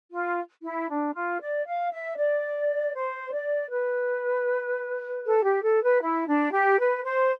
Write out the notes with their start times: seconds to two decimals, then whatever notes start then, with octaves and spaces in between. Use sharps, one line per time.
0.12 F4
0.63 E4
0.89 D4
1.14 F4
1.40 D5
1.66 F5
1.92 E5
2.17 D5
2.95 C5
3.32 D5
3.71 B4
5.25 A4
5.44 G4
5.63 A4
5.82 B4
6.02 E4
6.27 D4
6.52 G4
6.79 B4
7.04 C5